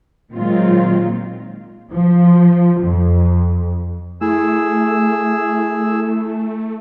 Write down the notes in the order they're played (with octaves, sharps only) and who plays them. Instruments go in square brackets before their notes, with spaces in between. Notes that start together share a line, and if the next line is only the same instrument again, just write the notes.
[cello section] A#2 D#3 F#3 G#3 C4 F4
[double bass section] F3
F2
[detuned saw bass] A3 [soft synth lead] E4 [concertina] G#4 E6